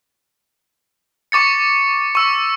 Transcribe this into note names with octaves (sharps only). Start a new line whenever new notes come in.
C#6 D6 A6 C#7
C#6 E6